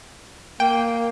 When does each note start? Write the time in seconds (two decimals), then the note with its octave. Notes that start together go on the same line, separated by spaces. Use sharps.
0.60 A#3 G5